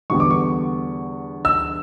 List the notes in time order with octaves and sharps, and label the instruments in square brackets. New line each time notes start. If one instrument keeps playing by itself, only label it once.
[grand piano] E2 D3 G3 B3 C#6
D6
C#6
E6